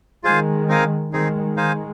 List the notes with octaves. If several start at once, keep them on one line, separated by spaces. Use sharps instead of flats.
D#3 G#3 F4 G#4 C5 F5 G#5
C4 D#4 A#4 F5 G#5
D#3 G#3 C4 D#4 G#4
D#3 G#3 D#4 C5 F5 G#5